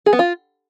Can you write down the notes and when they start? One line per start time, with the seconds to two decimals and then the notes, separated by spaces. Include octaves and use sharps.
0.06 G#4
0.13 B3
0.19 F4